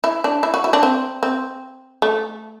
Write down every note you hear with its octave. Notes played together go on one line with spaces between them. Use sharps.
E4
D4
E4
F#4
E4
D4
C4
C4
A3